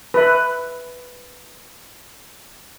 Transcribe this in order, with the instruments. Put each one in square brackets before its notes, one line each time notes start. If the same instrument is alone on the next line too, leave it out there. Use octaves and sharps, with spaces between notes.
[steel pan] B4 E5